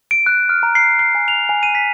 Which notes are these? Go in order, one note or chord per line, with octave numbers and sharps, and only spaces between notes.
D7
F#6
F6
A#5
C7
C7
G#5
F7
G#5
D#7
B6